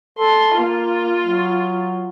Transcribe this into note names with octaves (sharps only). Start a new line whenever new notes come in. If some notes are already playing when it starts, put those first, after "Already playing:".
A4 C6
A#3 F4
F#3